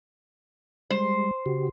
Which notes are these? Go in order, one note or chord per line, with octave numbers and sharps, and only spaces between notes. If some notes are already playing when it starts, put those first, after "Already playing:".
G3 G#3 C5
C#3 F#4 G4